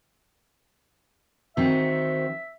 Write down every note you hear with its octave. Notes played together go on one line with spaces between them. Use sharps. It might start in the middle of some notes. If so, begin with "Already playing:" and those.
D#3 C4 F#4 E5